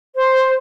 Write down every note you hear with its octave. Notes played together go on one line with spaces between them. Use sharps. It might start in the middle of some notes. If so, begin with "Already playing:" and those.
C5